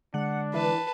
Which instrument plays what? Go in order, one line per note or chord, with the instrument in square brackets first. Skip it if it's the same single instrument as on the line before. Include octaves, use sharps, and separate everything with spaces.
[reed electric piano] D3 G#3 [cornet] D4 [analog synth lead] F#5
[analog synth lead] E3 [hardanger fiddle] B4 A5